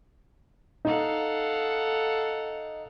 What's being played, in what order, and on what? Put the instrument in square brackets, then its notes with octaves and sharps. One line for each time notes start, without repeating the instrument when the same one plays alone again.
[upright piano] D#4 [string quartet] A4 F5 F#5